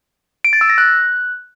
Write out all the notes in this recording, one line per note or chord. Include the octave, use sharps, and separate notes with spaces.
D7
A6
E6
A#6
F#6